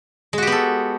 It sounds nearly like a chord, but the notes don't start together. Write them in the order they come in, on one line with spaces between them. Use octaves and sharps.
G#3 F#4 G4 B3 A4